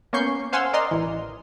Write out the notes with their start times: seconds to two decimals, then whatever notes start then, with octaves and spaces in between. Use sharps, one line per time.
0.13 A#3 B3 C#4 C#6 G6 C7
0.53 C5 F5 F#5 G#5 C6 E6
0.73 A#4 D5 D#5 A#5 C6
0.91 A1 E3